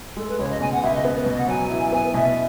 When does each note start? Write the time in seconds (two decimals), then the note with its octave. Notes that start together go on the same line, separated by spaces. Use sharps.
0.17 G#3 A4
0.28 B4
0.39 C#2 C#5
0.49 D#5
0.60 B2 G#5
0.72 F#5
0.83 C#2 E5
0.93 D#5
1.05 B3
1.15 B4
1.26 B2 D#5
1.37 F#5
1.48 F#3 G#5
1.70 E4
1.92 B3 G#5
2.14 B2 E5